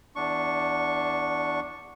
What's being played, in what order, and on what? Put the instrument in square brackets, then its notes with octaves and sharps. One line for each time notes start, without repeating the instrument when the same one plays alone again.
[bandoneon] E2 D4 C#6